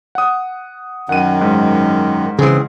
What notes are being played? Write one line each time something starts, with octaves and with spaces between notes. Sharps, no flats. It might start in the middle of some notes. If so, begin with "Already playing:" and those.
F#5 D#6
F#2 D#3 F#5 D#7
G#2
C#3 E3 C4 G#4